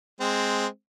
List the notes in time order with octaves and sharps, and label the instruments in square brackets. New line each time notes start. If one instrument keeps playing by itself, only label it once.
[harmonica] G#3 C4